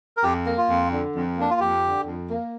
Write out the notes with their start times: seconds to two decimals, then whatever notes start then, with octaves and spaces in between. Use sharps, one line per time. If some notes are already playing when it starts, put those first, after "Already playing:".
0.17 A#4
0.23 F2 G4
0.46 A#3
0.58 F4
0.69 F2
0.91 D3
1.15 F2
1.37 A#3 D4
1.50 F4
1.60 F2 G4
1.83 D3
2.05 F2
2.28 A#3